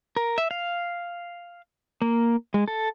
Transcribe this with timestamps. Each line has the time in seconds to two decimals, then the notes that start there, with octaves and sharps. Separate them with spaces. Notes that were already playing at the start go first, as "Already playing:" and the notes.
0.16 A#4
0.38 E5
0.51 F5
2.02 A#3
2.54 G#3
2.68 A4